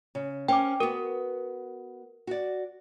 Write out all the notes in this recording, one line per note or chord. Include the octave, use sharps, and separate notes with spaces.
C#3
C#4 A#4 C5 G5 D6
B3 F#4 A#4
F#4 D5